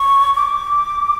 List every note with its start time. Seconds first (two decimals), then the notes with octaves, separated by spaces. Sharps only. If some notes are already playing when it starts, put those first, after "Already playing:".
Already playing: C#6
0.35 D6